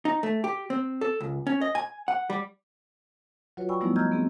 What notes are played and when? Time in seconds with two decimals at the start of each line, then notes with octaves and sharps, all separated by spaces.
0.05 D#4
0.23 A3
0.44 G4
0.70 C4
1.01 A4
1.21 C#2
1.47 C#4
1.61 D#5
1.75 G#5
2.08 F#5
2.30 G3
3.57 F#3 F4 F#4 B4 C#5
3.69 D5 G5 G#5 B5 C#6 E6
3.81 F3 G3 A3 B3 D#4 E4
3.96 D#5 A#5 E6 F6 G6 G#6
4.12 B3 C4 G#4